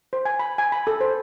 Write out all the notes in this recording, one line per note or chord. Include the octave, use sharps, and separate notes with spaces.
C5
G#5
B5
G#5
B5
A4
C5